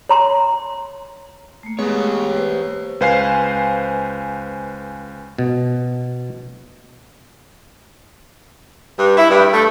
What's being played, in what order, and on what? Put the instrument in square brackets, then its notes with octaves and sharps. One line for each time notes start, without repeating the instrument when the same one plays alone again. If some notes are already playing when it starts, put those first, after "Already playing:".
[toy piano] C#5 A#5 C6
[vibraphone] A3 A#3
[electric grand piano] G#3 B3 [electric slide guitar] G4 C#5
[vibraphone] B4 C5
[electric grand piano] C#2 B4 C5 F5 G#5 C7
[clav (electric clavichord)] B2
[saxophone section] G2
E4
G2
A3